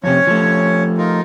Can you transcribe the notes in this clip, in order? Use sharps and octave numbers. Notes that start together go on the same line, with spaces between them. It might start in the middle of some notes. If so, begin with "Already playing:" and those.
F2 C3 C#4 C#5
F3 A3
D#4 F4 A#4